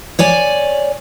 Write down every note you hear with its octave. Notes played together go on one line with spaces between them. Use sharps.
C#5 D5 G#5